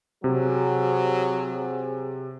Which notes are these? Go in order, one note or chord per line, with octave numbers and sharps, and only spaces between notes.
C3 F#3 G#4